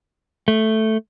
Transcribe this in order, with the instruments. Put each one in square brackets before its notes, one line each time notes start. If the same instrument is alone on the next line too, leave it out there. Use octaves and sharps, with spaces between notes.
[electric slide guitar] A3